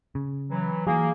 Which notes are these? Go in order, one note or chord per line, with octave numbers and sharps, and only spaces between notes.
C#3
E3 F#3
E3 F#3 A#3 G#4